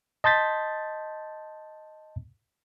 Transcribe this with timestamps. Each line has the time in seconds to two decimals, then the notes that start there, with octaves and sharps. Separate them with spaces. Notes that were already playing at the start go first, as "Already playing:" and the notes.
0.24 D#5 A5 C6 G6 A6 B6